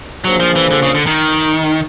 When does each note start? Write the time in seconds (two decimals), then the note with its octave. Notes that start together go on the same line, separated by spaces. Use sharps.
0.24 F#3 A#3 D4 F4 G#4 C5
0.40 F3
0.56 E3
0.71 D3
0.82 C#3
0.94 D3
1.06 D#3